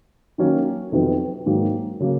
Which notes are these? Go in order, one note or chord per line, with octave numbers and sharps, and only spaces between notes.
D#3 F#3 A#3 C#4
F2 C3 D#3 F#3 B3
G#2 D#3 F#3 A#3
C#3 F#3 A#3